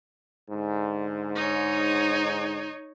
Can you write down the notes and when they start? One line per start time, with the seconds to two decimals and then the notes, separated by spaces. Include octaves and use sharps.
0.50 G#2 D3
1.35 D#4 C#5